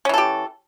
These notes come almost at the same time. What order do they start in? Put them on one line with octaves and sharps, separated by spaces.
C#4 E3 A4 G4